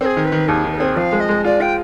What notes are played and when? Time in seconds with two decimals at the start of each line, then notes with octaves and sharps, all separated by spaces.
0.01 C4 G#4 B4
0.17 D#3
0.25 B4
0.32 D#3
0.48 D#2 G#4
0.64 D#3
0.73 B4
0.77 C4 G#4
0.96 F3 F5
1.12 G#3
1.20 D#5
1.29 G#3
1.44 F4 D5
1.60 F4 G5